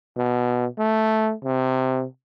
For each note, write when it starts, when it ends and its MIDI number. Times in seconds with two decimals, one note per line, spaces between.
0.17 0.66 47
0.79 1.34 57
1.44 2.05 48